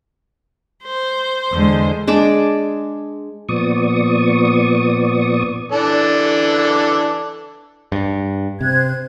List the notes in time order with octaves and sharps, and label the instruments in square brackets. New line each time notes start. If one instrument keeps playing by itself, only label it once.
[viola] C5
[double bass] E2 G#3 [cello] D3
[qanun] G#3 D4 A5 D6
[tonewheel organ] A#2 F3 B3 D5 C#6 D#6
[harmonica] E3 D4 A4
[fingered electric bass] G2
[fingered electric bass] C3 [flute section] C5 F#6 G#6